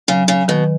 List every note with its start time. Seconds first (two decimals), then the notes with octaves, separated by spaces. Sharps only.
0.08 C#3 F#3
0.28 C#3
0.48 B2 D#3